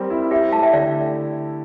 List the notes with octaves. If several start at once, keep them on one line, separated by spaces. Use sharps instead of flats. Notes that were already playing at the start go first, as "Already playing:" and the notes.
Already playing: G3 C4 A#4
E4
G4 E5 G5
A3 F5 A5
E5 G5
D3 D5 F5